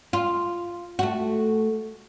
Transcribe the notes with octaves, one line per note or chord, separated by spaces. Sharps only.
F4
A3 F#4